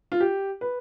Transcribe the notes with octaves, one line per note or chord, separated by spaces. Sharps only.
F4
G4
B4